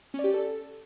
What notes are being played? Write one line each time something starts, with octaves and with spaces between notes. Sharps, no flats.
C#4
D5
G4
D5
A4